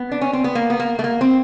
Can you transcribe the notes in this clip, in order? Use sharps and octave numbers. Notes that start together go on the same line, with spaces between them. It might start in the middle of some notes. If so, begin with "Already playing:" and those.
Already playing: B3
D4
C#4
C4
B3
A#3
B3
A#3
A3
A#3
C4